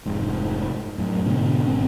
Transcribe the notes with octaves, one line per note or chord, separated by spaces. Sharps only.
F1 G#2
F#2 A2
G#2 B2 D3
G#1 C4 C#4